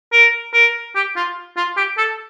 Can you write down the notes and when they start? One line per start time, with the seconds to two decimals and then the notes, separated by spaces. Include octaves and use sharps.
0.13 A#4
0.54 A#4
0.95 G4
1.16 F4
1.57 F4
1.77 G4
1.98 A4